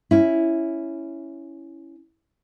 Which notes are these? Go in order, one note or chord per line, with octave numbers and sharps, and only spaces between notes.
C#4 E4